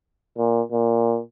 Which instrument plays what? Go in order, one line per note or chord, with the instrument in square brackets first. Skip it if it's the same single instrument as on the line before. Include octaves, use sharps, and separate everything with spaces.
[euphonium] A#2
A#2